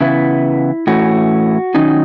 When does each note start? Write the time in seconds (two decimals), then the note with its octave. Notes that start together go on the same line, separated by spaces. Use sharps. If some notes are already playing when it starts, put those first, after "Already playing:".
0.01 C#3 E3 B3 E4
0.87 A2 E3 A3 C#4 F#4
1.75 D#3 F#3 C#4 D#4